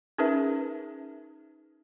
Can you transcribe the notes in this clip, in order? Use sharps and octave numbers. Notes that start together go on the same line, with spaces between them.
C#4 D#4 G#4 A#4 B4 E5